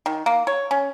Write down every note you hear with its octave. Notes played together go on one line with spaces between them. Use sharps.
D#3
A#3
C#5
C#4